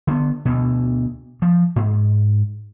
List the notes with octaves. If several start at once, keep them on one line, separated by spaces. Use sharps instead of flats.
D3 B3
D2 B2
F3
G#2